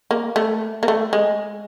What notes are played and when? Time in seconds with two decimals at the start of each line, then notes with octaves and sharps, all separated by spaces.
0.11 A#3
0.36 A3
0.83 A#3
0.88 A3
1.13 G#3